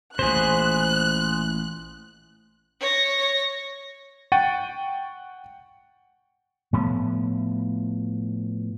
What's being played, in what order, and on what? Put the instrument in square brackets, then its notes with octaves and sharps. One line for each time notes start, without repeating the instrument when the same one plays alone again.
[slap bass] A1 A#2 [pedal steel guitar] G#4 C5 [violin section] F#6
[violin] C#5 A#6
[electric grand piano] F#5 G5 C#6 A6 D#7
[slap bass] A2 F3 B3